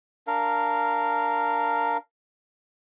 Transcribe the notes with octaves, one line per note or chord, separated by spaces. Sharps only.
D4 A#4 F5